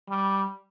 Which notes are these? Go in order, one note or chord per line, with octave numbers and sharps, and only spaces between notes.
G3